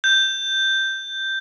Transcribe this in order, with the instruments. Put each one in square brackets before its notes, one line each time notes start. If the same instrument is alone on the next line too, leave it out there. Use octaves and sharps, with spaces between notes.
[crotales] G6